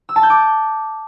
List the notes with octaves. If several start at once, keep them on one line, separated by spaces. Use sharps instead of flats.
E6
A5
G6
D6